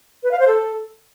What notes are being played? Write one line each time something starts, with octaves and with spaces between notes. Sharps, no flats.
B4
F5
C5
A4